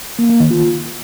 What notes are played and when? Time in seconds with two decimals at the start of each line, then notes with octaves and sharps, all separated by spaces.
0.19 A#3
0.29 A#3
0.40 D#3
0.51 F4